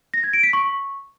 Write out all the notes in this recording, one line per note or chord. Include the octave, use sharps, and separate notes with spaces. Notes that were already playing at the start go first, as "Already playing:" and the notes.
A#6
G#6
D7
B6
C#6